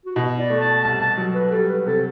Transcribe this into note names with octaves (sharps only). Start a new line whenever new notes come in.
F#4
B2 E4
D5
A3
A5
C2 A5
A5
F#3
B4
G3 A4
B4
C3 A4